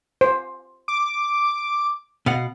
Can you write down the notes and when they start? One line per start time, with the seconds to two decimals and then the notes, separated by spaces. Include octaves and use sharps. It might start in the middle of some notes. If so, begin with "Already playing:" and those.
0.21 C5
0.88 D6
2.26 B2 F5 F#5